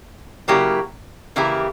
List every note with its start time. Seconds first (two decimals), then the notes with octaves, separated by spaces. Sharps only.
0.48 C#3 F#3 A#3 E4 G4
1.36 C#3 E3 A#3 E4 G4